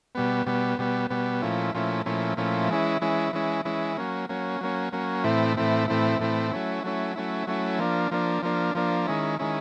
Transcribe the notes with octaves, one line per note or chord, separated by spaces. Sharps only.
B2 G3 B3
B2 G3 B3
B2 G3 B3
B2 G3 B3
A#2 F3 A3 C#4 E4
A#2 F3 A3 C#4 E4
A#2 F3 A3 C#4 E4
A#2 F3 A3 C#4 E4
E3 G#3 C#4 E4
E3 G#3 C#4 E4
E3 G#3 C#4 E4
E3 G#3 C#4 E4
F#3 A#3 C#4
F#3 A#3 C#4
F#3 A#3 C#4
F#3 A#3 C#4
A2 E3 A3 C4 E4
A2 E3 A3 C4 E4
A2 E3 A3 C4 E4
A2 E3 A3 C4 E4
F#3 A3 C#4 E4
F#3 A3 C#4 E4
F#3 A3 C#4 E4
F#3 A3 C#4 E4
F3 A#3 D4
F3 A#3 D4
F3 A#3 D4
F3 A#3 D4
D#3 G#3 C#4 E4
D#3 G#3 C#4 E4